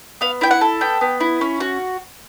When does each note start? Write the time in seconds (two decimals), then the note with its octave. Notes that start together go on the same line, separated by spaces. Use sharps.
0.21 B3 F5
0.41 E4 G5
0.51 F#5
0.61 A4
0.81 B3 G5
1.01 B3
1.20 E4
1.41 C#4
1.60 F#4